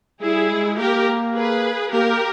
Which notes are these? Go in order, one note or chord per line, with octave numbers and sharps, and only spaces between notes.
G3 E4 G#4
G#3
A#3 G4 A#4
G#4 B4
A#3 G4 A#4